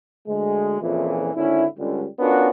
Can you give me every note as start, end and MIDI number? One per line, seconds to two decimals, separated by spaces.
0.28 0.76 38
0.28 0.76 56
0.81 1.31 41
0.81 1.31 46
0.81 1.31 49
0.81 1.31 52
1.35 1.65 32
1.35 1.65 50
1.35 1.65 61
1.35 1.65 64
1.78 2.06 37
1.78 2.06 50
1.78 2.06 55
2.19 2.49 59
2.19 2.49 61
2.19 2.49 62
2.19 2.49 65
2.19 2.49 66
2.19 2.49 70